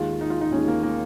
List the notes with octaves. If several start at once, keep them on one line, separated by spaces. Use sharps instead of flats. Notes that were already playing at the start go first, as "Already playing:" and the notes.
Already playing: D#2 D#3 G#3 F4
D#4
F4
D#4
D#2 D#3 G#3 C#4
A#3
A#3